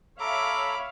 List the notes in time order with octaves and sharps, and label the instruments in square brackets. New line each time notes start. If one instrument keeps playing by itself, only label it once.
[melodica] A4 A#5 [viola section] C#5 E5 F5 [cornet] B5 [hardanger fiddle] D6